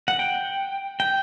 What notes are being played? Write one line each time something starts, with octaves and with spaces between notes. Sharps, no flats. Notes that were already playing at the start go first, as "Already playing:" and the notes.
F#5
G5
G5